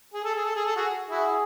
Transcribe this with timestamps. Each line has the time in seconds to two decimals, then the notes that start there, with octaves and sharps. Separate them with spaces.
0.14 G#4
0.24 A4
0.35 G#4
0.45 A4
0.56 G#4
0.66 A4
0.76 F#4 G#4
1.09 E4 F#4 G#4